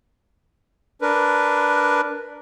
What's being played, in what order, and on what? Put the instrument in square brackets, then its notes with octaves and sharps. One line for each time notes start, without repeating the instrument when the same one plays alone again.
[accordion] D4 A#4 B4